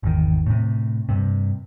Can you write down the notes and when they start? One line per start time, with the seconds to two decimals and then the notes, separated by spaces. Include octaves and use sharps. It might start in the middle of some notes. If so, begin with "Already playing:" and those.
0.03 G#1 E2 D#3
0.46 A2 C3
1.09 G2 C3